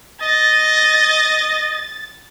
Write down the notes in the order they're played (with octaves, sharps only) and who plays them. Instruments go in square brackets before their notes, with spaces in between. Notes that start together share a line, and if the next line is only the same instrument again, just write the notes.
[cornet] D#5 [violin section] A6